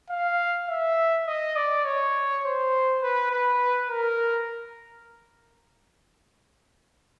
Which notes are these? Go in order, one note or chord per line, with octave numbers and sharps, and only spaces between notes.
F5
E5
D#5
D5
C#5
C5
B4
B4
A#4